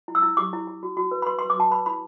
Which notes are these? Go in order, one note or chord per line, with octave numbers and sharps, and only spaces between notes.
E4
E6
E4
G4 D6
E4
E4
F#4
F#4
B4
B5
B4 C6
C6
B4
D6
F#4 A5
B4 B5
E4 B5